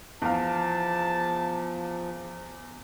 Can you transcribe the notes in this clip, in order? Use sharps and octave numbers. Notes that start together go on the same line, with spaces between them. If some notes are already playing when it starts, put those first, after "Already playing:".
E2 F3 F5 A5